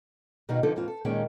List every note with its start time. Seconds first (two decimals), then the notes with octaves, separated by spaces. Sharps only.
0.49 B2 D#3 G3 D#4 F4 F#4
0.63 D3 E3 F3 D#4 A4
0.76 D#2 G#2 E3 C4 F4
0.88 A4
1.05 D#2 A#2 D#3 G#3 C#4 G5